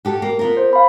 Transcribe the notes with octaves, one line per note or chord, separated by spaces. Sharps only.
F#4 G4 A4
A#3
B3 F4 A#4
C5
F5 B5